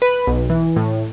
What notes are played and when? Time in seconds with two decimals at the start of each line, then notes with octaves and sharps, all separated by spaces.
0.02 B4
0.27 B1
0.50 E3
0.76 A2